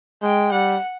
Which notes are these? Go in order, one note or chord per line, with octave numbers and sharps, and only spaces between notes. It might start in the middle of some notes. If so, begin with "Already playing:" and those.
G#3 G5
G3 F#5